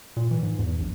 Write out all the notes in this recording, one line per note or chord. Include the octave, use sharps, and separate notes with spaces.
A#2
E3
G#2
E2
A#1